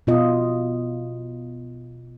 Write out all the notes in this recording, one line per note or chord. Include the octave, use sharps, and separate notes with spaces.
B2 B3 F4 D#5